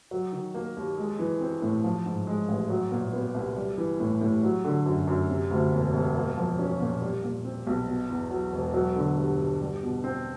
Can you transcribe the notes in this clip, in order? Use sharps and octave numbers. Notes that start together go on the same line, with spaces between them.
F#3
D#3
A#3
D#2
G#3
E3
C4
A2
F3
G#2
G#3
A1
F#3
A#2
B3
C2
G3
E3
A2
A2
F#3
D3
F#2
F#2
C3
D2
E1
E1
A#3
F3
C#4
A#2
G3
A#2
C4
B1
B2
E2
F#3
E1
F#3
D3
G2
G2
G3
B2
C4